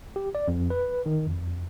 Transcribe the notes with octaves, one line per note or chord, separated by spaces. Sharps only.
G4
D5
F2
B4
D#3
F2